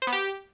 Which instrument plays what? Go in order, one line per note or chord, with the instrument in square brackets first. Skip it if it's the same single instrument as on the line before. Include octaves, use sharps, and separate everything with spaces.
[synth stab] C5
B3
G4